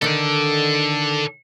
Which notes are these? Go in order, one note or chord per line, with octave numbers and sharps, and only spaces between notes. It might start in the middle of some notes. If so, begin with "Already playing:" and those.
D3 D#3 A4 D5